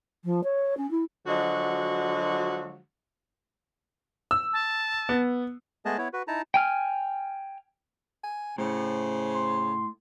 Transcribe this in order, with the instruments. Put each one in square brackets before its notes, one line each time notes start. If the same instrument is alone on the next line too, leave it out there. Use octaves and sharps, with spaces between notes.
[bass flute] F3
C#5
C#4
E4
[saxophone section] D3 F3 F#3 G#3 F#4
[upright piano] E6
[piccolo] A5
[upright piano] B3
[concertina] G#3 A3 B3 G#4 D#5 A5
B3 E4 C#5
F#4 B4
D#4 E4 A5 A#5
[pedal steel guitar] G5 G#5 F6
[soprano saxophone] G#5
[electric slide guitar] A2 [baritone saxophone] C#3 [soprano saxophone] C5
[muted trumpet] C6